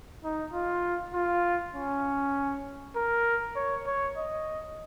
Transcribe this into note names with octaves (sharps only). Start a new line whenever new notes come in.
D#4
F4
F4
C#4
A#4
C#5
C#5
D#5